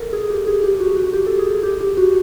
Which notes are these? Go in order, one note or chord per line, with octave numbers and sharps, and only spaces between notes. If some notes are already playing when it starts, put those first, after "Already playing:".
Already playing: A4 A#4
G#4
G4
G#4
G4
F#4
F#4
G4
A4
G#4
G4
G4
F#4